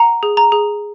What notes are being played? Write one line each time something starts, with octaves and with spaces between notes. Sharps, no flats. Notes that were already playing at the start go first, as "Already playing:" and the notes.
Already playing: F#5 A#5
G#4
A#5
G#4